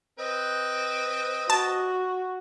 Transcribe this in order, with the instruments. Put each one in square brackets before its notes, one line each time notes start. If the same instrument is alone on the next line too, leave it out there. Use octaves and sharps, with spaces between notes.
[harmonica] C4 B4 [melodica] D#5
[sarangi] F#4 [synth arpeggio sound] A5